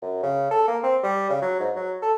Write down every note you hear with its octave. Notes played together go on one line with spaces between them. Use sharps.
F#2
C#3
A4
A#3
C4
G3
C#3
F#3
G#2
F#3
A4